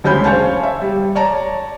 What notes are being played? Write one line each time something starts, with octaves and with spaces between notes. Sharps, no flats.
F#1 D2 G#3 C#4 B5 G6
C5 C#5 F5 G#5 A5
E5
G3
C#5 D5 A5 A#5